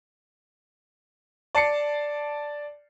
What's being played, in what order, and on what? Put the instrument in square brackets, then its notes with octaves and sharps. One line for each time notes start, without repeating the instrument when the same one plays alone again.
[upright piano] D5 A5 C7 C#7